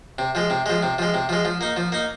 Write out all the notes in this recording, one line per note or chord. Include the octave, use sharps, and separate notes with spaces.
C3
F3 G#3
C3
F3 G#3
C3
F3 G#3
C3
F3 G#3
F3
A#3 D#4
F3
A#3 D#4